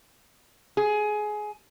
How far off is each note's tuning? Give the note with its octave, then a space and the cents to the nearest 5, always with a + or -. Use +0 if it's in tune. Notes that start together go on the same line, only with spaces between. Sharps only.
G#4 +20